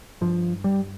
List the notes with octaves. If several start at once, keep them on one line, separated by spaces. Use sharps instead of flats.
G2 F3
G3